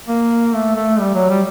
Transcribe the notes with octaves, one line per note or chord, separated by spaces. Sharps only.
A#3
A3
A3
G3
F#3
G3